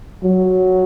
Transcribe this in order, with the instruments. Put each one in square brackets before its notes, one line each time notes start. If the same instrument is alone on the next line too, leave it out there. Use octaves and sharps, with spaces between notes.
[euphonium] F#3